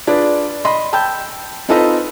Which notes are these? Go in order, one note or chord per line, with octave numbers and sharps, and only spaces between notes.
D4 F4 G#4 B4 D5
D#5 B5 C6
G5 A5 B5 E6 G6
C4 D#4 F4 A4 B4 D#5